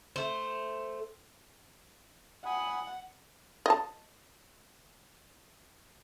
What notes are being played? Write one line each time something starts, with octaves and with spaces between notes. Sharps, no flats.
A3 C5
F#5 G#5 B5 D#6
D#5 A5